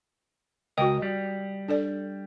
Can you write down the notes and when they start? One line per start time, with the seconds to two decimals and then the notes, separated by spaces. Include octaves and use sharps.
0.78 C#2 F#4 A#4 D#5 G5
1.02 G3
1.68 D4 A4 D5